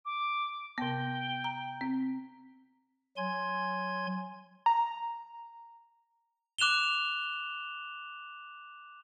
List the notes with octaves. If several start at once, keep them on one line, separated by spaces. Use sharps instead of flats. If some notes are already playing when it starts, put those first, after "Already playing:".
D6
C3 B3 G5
A#5
C4
F#3 G#5 C6 G#6
A#5
D6 F#6 E7 F7 G7